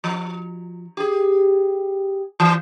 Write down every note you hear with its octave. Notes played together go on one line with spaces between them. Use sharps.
F3
G4 G#4
E3